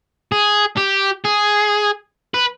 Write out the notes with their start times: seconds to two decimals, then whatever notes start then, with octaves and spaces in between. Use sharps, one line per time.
0.32 G#4
0.78 G4
1.25 G#4
2.34 B4